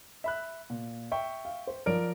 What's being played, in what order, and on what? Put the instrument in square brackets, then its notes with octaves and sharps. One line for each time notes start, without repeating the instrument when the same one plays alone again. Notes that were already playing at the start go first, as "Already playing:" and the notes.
[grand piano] E5 B5 F#6
A#2
E5 G5 C#6
[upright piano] F5
C5
[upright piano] F3 C#5 [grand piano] A#4 D5 D7